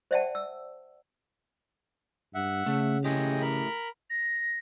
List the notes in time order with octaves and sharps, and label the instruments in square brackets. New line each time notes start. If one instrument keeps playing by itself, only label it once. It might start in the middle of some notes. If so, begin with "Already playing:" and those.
[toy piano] C5 D5 E5 F#5 G5 A5
E6
[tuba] G2 [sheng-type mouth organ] E5 F#5
[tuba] C#3 [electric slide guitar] A3
[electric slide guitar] A3 E4 G4 [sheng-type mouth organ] G#4 D#5 G5
[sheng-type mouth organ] A#4 B5
[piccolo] A#6